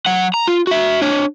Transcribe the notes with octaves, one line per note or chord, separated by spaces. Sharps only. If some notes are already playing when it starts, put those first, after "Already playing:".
F#3 F#5
A#5
F4
F#4 E5
D4 C#5